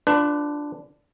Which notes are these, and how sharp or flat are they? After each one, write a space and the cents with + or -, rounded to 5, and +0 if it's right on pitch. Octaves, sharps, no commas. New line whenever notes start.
D4 +0 F4 +0 B4 +30